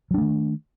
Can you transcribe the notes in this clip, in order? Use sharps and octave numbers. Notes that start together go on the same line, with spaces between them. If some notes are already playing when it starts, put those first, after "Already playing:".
D#3 F#3 A3 D4